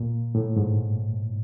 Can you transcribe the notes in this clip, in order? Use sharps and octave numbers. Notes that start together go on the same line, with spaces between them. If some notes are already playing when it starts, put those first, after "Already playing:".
Already playing: A#2
A2
G#2